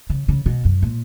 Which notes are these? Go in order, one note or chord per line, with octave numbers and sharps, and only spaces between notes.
C#3
C#3
B2
F#2
A#2